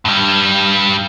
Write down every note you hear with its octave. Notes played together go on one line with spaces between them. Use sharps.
G2 G3